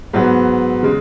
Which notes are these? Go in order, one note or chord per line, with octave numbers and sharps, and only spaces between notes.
G#2 F#3 B3
C#3 G#3